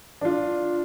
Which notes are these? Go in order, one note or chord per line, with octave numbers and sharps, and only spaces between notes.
D4 F4